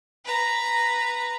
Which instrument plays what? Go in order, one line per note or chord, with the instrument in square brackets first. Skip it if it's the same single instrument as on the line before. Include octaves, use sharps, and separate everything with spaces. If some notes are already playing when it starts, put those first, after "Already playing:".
[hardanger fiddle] B4 A#5